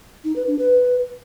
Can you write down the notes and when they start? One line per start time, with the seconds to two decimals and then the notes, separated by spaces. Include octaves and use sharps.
0.24 D#4
0.36 B4
0.47 D4
0.59 B4